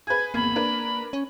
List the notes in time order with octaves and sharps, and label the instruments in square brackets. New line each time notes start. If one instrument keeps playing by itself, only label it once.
[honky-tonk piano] G#4 B4 [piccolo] G#6
[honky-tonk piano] G#1 E2 G#6 [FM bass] A#3 [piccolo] B5
[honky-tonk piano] D4 A#4 B4
[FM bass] C#4